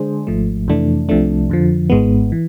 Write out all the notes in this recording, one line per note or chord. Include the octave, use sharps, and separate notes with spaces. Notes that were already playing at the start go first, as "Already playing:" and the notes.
Already playing: D3 G#3 D4 G#4 C5
G#1 G#2 F3 A3
F2 C3 E3 A3 D4
C2 C3 F3 A3 D4
F2 D3 F3
G#1 G#2 G#3 B3
E3